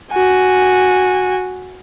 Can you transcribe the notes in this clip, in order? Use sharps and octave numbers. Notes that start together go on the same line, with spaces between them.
F#4 G#5